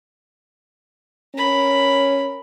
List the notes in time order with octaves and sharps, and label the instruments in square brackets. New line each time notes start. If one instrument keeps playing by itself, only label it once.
[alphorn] C#4 [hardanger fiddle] A#4 B5